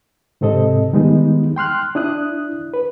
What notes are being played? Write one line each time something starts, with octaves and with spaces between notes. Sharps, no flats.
G#2 C3 C4 A4 D#5
D#3 G3 G#3 B3 D#4
G5 C6 F6 F#6
D4 E4 D#6 F#6
B4